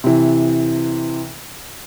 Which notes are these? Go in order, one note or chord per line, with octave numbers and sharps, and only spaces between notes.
C3 E3